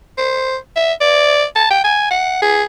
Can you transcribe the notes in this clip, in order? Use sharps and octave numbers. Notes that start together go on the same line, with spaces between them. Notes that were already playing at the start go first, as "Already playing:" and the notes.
C5
E5
D5
A5
G5
G#5
F#5
G#4